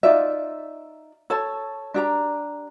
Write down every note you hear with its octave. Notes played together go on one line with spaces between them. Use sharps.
D#4 F4 D5 E5
A4 C#5 A5
D4 G4 A#5